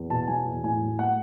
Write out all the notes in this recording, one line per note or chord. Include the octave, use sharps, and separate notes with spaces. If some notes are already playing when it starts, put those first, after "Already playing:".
Already playing: E2
B2 A5
F#3 G#5
E2
A2 G#5
F#3
A3 F#5